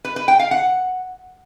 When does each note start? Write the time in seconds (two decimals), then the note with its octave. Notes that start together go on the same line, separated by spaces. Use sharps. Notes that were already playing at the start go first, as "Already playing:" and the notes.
0.05 B4
0.16 B4
0.28 G5
0.40 F5
0.51 F#5